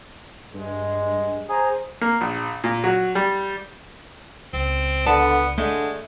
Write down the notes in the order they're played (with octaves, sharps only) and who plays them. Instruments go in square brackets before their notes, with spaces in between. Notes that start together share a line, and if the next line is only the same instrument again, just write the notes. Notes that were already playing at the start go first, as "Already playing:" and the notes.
[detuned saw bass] G2 [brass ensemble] G#3
[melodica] G#4 [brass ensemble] C5 A#5
[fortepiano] A#3
A#1
A#2
F#3
G3
[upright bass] C#2 [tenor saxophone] C4
[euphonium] D3 [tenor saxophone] B3 [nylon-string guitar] D5 A5
[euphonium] D3 [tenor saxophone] G#3 [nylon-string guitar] A3